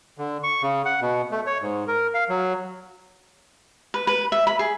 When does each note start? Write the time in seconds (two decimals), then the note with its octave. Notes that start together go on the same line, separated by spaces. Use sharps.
0.18 D3
0.43 C#6
0.62 C#3
0.85 F#5
1.01 B2
1.32 A3
1.46 C#5
1.62 G#2
1.88 A#4
2.14 F5
2.29 F#3
3.94 B4
4.07 B4
4.32 E5
4.47 B5
4.59 G#4